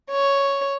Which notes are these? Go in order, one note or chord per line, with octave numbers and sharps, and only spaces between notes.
C#5